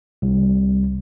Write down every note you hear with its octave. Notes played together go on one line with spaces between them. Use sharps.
C2